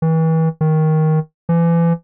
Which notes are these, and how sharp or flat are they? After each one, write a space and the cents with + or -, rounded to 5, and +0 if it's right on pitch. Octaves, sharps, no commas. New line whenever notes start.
E3 -35
D#3 +10
E3 +35